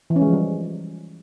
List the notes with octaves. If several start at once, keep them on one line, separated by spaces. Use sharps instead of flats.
E3
C#4
G#3
F3
G3